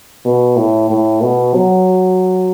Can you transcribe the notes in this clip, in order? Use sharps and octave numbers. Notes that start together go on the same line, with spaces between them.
B2
A2
A2
B2
F#3